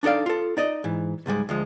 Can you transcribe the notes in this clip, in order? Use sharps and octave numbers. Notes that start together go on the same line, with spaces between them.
D4 D#4 A4 D5 F5
F4 A4
D#4 D5 D#5
G#2 E3
C#2 G#2 G3 G#3
D2 F3 G#3